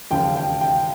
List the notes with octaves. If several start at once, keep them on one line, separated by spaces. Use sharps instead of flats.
E1 D#2 C#3 F3 G5
G5
G5